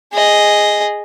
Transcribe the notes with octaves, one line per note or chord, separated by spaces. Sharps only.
G#4 D#5